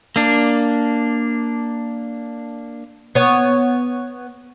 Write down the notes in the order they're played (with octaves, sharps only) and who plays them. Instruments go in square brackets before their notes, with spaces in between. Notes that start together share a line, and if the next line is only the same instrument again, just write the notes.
[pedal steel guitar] A#3 D4
[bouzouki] B3 C#5